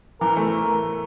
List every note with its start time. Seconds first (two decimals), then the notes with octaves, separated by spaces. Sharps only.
0.21 E3 A#4
0.37 A3